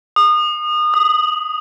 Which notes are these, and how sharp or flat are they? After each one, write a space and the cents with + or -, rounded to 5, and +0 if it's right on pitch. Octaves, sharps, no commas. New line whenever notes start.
D#6 -30
D#6 +0